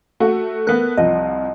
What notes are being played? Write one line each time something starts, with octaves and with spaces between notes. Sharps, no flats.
A3 F#4
A3 B3 A#4 F#6
C2 F3 D#5